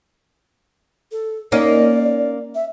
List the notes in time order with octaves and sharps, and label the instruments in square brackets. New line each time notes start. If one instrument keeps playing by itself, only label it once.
[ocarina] A4
[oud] A#3 C#4 D#4 [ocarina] D5
[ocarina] E5